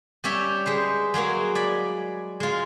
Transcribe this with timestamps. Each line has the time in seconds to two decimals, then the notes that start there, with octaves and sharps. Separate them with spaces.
0.24 G3 C#4 G4 C#5 E5
0.66 G#3 B4 C5
1.14 F#3 G#3 A#3 F#4
1.55 D5 G#5 B5
2.40 G#3 F4